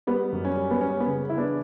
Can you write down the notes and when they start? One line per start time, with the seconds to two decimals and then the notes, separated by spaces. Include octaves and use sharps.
0.07 G3 B3
0.32 F#2
0.45 C#4
0.57 G3
0.71 B3
0.81 G3 C#4
1.00 B3
1.07 C#3
1.29 E3 E4
1.37 B3 D4